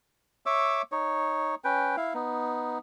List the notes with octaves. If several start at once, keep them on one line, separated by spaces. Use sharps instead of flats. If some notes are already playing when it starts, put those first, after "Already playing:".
C#5 E5 D6 E6
D#4 C#5
C#4 B4 G5
E4 F5
B3 D#4